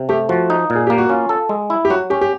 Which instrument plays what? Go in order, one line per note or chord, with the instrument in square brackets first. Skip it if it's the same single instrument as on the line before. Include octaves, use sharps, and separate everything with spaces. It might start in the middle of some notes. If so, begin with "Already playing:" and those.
Already playing: [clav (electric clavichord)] C3
[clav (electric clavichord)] A3 [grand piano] G4
[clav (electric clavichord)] F3 [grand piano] F#4
[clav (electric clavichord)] D#4
A#2
[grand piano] G#4
[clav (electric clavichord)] A#3 [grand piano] G4
[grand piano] F#4
[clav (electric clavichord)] C#4 [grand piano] F4
[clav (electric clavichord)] A4
G#3
E4
[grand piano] G4
[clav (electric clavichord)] F#3 [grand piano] F#4
[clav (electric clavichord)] C#4 [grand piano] G4
[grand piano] G4